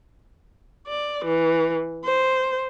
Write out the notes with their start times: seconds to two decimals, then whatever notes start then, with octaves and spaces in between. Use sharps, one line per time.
0.88 D5
1.25 E3
2.04 C5